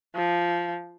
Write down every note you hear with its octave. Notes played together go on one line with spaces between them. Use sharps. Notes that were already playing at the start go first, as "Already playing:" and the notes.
F3